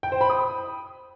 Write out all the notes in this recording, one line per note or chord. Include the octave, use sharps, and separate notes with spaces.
G5
C5
B5
D#6